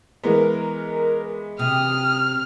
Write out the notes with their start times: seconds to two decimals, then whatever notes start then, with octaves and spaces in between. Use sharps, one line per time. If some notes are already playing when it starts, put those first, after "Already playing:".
0.24 E3 G#3 B3 A#4
1.59 C3 D#6 F6